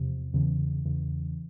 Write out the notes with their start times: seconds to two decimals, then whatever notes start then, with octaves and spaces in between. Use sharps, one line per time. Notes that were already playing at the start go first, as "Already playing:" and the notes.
Already playing: E2 C3 F3
0.33 E2 C#3 E3
0.85 E2 C#3 E3